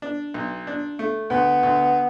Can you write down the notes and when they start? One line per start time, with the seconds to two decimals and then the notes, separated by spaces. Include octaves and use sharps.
0.02 D4
0.34 B1
0.67 D4
0.99 A3
1.30 D2 B3
1.63 D2